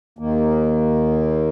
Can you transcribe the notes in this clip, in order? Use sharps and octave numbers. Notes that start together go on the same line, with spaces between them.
D#2 D#3 A#3